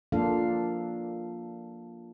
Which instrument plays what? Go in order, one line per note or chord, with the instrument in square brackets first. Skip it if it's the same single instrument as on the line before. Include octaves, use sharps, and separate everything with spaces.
[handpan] F3 A#3 D4 F4 A4 F5